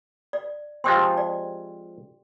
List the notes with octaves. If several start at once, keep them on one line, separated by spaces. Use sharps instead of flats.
D5
F3 G#3 C4 G4 G5 C6
D5